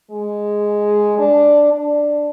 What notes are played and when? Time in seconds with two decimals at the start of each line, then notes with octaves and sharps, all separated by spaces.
0.11 G#3
1.18 D4
1.72 D4